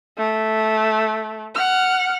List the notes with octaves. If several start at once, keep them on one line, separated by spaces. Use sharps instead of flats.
A3
F#5 F6